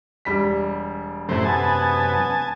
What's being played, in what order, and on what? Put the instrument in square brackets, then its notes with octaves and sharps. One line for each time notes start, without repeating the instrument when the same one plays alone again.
[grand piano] E1 G3 B6
[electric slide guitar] F#2 C3 E4 [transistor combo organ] A2 C5
[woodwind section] B3 [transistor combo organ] G#5 A5